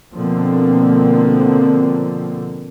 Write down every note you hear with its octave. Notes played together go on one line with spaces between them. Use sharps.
B2 D3 F3 A#3 C4